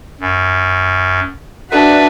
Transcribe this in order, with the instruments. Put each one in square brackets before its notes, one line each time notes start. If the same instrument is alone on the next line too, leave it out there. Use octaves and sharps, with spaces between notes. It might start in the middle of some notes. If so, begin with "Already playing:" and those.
[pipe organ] F#2
[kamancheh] D4 F#4 [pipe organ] B4 E5